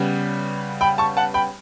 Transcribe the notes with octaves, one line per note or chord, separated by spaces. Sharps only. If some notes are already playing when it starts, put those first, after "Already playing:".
Already playing: C#3 G3 B3
G5 B5
A5 C#6
F#5 A5
G5 B5